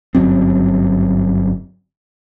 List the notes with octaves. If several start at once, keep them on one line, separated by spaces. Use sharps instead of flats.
G1 F#2 F#3 C4